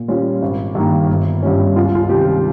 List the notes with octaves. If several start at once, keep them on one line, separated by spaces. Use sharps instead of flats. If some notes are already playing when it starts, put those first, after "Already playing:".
Already playing: A#2
G3 C#4 F4
G#1
G2 D#3 A#3
G1
G2 G3 C#4
C#2 F4
F4
C3 D#3 G3 G4